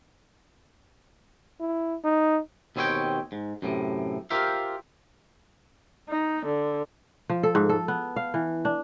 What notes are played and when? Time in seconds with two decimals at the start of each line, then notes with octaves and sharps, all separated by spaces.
1.60 E4
2.04 D#4
2.76 D#2 B2 C4 G#4 C#5 G5
3.32 G#2
3.62 F#2 A2 C3
4.30 F4 G4 A#4 C5 E5 F5
6.09 D#4
6.46 D3
7.30 F3
7.43 A4
7.55 G#2
7.69 A4
7.88 B3
8.16 F5
8.34 E3
8.65 D4